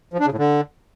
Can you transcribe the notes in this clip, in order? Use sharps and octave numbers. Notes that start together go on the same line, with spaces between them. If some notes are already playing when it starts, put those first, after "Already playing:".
F3
D4
C#3
A2
D3